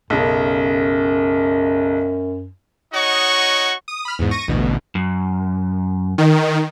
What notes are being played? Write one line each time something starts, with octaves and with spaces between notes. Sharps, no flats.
B1 F#2 C#3
D#4 F#4 C#5 D#5 F#5 C#6
D#6
B5 F6
E2 G#2
C#6 A#6 D#7
A1 D2 B2
F#2
D#3